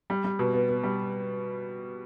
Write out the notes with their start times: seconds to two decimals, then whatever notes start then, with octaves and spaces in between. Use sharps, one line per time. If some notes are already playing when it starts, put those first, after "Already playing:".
0.10 G3
0.24 G3
0.39 B2
0.53 B3
0.69 B3
0.83 G3